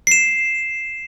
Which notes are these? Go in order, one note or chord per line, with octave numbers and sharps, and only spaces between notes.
C7 E7